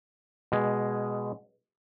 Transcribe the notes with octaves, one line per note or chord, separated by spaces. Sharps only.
B2 G#3